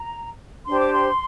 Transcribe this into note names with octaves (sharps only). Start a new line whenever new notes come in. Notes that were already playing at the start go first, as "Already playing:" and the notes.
Already playing: A#5
D4 G4 C5 C6
D6
C6